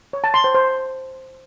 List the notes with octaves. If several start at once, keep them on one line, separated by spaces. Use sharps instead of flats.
C#5
A5
C6
C5
C5